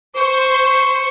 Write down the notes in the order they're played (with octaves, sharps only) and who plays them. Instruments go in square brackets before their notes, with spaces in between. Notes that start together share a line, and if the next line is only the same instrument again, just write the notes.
[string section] C5 [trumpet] C#6